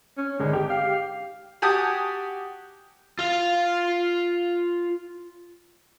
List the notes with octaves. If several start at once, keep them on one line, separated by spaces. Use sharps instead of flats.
C#4
G#1 D3 G#3
G4
F5
F#4 G4 G#5 A5 D#6
F4 F5